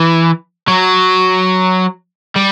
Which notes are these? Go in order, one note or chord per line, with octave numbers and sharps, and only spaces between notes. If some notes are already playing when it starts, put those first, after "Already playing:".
Already playing: E3
F#3
G3